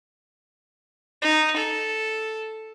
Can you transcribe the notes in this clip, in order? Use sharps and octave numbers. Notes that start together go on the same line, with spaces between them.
D#4
A4